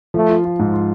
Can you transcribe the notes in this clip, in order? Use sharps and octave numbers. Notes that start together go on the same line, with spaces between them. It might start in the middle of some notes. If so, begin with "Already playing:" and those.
F3 A3
F4
F4
G#2
F4